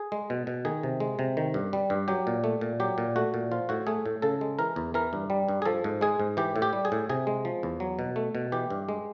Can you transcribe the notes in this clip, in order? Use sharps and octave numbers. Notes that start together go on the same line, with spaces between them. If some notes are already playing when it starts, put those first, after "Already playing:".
Already playing: G#4
G#3
B2
B2
D#3 G#4
C3
G#3
C3
D#3
G2
G3
G2
F#3 G4
A#2
A3
A#2
F#3 G4
A#2
A3 F#4
A#2
F3 F4
A2 F#4
A3 G#4
A2
C#3 A4
G#3
E3 A#4
E2
E3 A#4
G2
G3
G2
G#4
F3 A4
G#2
G#3 G#4
G#2
E3 G4
A2
G4
G3
G#4
A2
C3 G#4
G#3
F3
E2
F#3
B2
A3
B2
E3 G4
G2
G#3